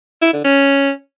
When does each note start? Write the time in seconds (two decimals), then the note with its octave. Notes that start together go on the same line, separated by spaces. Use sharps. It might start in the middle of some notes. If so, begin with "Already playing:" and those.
0.22 E4
0.33 D3
0.45 C#4